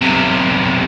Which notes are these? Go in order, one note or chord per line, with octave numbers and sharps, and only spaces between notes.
B1 C3